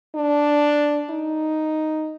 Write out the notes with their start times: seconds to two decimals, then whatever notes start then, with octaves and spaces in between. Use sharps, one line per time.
0.15 D4
1.10 D#4